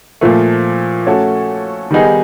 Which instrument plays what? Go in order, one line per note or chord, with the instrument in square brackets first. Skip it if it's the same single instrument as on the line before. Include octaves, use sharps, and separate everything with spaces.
[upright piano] A#2 F3 A3
A3 C#4 F#4 A4
D#3 G3 B3 D#4 G#4